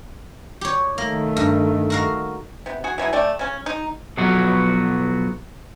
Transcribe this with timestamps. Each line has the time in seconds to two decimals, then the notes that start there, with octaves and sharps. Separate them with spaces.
0.61 G4 C#5
0.98 D#3 A3 A#3
1.37 G2
1.90 F#4 A#4 F5
2.66 C3 B3
2.84 F#4 G#4
2.98 E3 F#3 E4 G#4
3.13 A3 D5 G5
3.39 C#3 C#4
3.66 D#4
4.17 B1 F3 F#3 B3 F#4